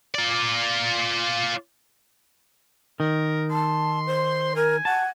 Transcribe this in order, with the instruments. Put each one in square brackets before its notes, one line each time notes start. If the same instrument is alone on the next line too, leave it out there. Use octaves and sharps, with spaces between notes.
[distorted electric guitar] F4 D5
[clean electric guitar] D#3 [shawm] A#4
[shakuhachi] A5 [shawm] C6
[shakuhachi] C5
[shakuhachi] A#4 [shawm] G#5
[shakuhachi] F#5 [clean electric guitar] A5